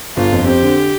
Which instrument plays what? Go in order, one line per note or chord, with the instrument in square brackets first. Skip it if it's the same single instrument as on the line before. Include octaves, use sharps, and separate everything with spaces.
[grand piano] G1 [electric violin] F4
[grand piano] F2
[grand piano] C4 [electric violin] G4
[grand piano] D3